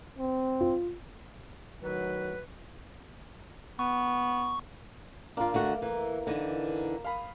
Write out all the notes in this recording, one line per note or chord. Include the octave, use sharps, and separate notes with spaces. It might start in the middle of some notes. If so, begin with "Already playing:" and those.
C4
F4
A2 D#3 F#3 B4
B3 C#6
A#3 D4 F4 A#4
D3 A3 F#4
E3
D3 E3 D#4
F5 B5 D#6